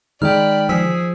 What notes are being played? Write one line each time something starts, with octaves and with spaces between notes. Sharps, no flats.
D#3 G#3 D5 G5 B5 F6
F3 G#4 E6 B6